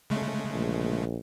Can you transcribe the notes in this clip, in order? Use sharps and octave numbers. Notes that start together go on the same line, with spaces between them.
C#3 G#3 A3
A#1